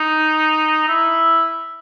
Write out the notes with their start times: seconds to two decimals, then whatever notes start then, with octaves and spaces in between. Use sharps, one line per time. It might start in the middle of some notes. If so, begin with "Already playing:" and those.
Already playing: D#4
0.88 E4